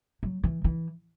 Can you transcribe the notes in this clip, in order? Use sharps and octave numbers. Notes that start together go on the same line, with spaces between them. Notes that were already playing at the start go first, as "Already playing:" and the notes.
F#3
E3
E3